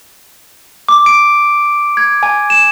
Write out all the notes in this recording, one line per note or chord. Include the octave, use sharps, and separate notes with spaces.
D6
D7
G#6
G#5
E7